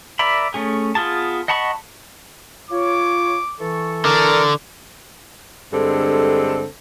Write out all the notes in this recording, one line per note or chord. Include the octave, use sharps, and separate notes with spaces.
A#4 D5 E5 A#5 B5
A3 C#4 G#4
B3 F4 G#4 A5
D#5 F#5 A5 B5 C#6
F4 C#5 D6
E3 A4 C#6
D3 A#4
G2 D3 G#3 C4 A4